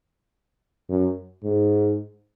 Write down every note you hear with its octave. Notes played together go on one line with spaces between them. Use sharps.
F#2
G#2